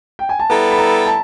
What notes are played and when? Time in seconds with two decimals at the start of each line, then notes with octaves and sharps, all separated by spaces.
0.19 G5
0.29 G#5
0.39 A5
0.50 G3 B3 E4 A4 A#5
0.71 B5
0.78 A#5
1.06 A5